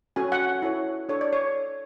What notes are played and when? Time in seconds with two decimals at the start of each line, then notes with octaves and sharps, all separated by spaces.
0.16 C#4 F#4 A4 C#5 G#5
0.32 F#5
0.62 E4 A4 C#5
1.09 D4 A4 C#5
1.21 D5
1.33 C#5